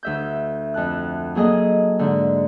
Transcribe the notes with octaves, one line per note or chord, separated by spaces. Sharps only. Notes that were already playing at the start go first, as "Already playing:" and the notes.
D2 E5 G6
F2 A5 F#6
F#3 A#3 G#4 A4 D#5
G#2 D3